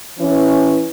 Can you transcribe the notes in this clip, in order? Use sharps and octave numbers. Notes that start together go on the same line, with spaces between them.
E3 C#4